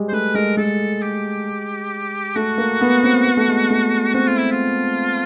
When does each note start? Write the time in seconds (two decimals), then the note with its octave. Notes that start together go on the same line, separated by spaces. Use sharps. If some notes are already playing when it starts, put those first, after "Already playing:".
Already playing: G3 G#3
0.09 C5
0.12 A3 B4
0.35 G#3 A#4
0.57 G#3 A4
1.02 G4
2.36 A3 F#4
2.58 A#3
2.81 B3
3.03 C4
3.25 B3
3.37 A3
3.48 G#3
3.70 A3
4.14 C4 F#4
4.27 F4
4.38 E4
4.51 F4